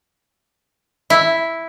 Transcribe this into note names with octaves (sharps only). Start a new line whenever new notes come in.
E4